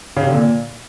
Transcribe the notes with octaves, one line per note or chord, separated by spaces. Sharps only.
C#3
C3
D3
A#2